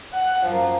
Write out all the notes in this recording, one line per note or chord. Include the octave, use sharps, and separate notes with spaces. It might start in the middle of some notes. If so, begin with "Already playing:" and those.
F#5
F#2 F3 A#3